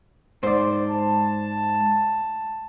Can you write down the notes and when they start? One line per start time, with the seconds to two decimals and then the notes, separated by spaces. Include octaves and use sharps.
0.43 G#2 C5 D5
0.87 A5